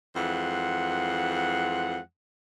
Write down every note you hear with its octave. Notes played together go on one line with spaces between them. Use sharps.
F2 E3 G#3 F#5